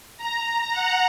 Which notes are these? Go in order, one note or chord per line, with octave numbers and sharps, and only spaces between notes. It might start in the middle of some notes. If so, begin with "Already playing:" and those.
A#5
F#5